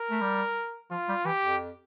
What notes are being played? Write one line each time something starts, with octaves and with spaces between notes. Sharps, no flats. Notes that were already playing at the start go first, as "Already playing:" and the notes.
Already playing: A#4
A3
G3
F3 F4
G3
E3 G4
F2